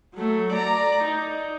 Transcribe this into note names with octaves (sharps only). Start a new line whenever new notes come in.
F#3 A3
D5 A#5
D#4